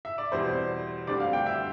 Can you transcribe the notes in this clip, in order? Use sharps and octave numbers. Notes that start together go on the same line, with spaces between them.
E5
D5
E2 B2 G3 C4 C5
D2 D3 G3 C4 D5
F5
G5
E5